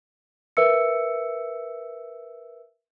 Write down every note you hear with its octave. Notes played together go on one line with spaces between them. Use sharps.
A#4 B4 E5 E6 C#7